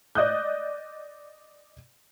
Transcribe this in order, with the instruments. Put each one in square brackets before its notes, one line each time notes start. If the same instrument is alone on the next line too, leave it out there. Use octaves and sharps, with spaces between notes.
[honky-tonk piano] D5 D#5 D#6 F#6 G6